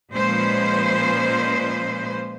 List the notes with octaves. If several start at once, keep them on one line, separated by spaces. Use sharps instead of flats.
A#2 F3 G#3 C#4 B4 C5